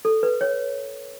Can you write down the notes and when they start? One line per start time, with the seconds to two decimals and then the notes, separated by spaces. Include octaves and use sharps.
0.05 A4
0.23 B4
0.41 C#5